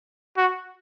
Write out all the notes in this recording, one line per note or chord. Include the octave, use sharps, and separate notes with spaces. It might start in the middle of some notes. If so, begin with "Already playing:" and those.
F#4